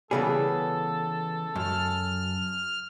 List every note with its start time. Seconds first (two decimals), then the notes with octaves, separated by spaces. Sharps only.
0.11 C#3 E3 G3 B3 G#4 A4
1.55 F#2 F6